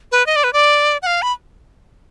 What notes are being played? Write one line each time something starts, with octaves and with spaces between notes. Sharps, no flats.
B4
D#5
D5
B4
D5
F#5
F5
B5